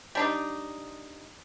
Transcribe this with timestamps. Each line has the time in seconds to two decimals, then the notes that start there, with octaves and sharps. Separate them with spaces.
0.15 G3 D4 D#4